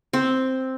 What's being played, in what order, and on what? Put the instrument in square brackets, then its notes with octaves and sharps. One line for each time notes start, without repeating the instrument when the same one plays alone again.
[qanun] C4